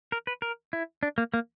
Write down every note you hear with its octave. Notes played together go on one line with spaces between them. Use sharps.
A#4
B4
A#4
E4
D4
A#3
A#3